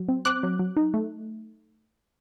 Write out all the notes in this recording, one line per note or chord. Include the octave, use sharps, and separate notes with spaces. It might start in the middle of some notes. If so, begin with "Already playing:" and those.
Already playing: F#3
C4
C4 D6 F#6
F#3
F#3
D#4
A3